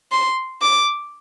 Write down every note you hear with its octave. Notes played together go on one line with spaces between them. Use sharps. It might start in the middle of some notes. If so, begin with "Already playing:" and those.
C6
D6